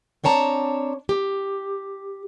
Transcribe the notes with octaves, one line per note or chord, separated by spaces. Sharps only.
C4 D4 C#5 A5 A#5
G4